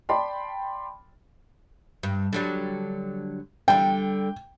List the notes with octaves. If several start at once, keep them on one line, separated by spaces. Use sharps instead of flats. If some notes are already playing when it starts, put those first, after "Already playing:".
D5 G5 A5 B5 C6
G2
D3 F#3 G3
D3 G3 G5